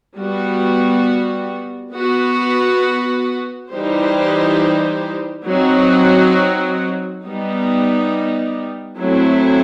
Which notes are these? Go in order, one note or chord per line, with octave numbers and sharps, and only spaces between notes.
G3 B3 F#4
B3 F#4 B4
E3 G3 D#4 G4 C5
F#3 C4 D#4 F#4
G3 B3 D#4
F#3 A3 C4 E4